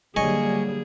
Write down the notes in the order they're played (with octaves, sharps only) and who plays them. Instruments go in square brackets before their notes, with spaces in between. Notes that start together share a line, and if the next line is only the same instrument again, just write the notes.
[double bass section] D3 F#3 G3 [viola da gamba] A#3 G#4 [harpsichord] C#5 D#5 G#5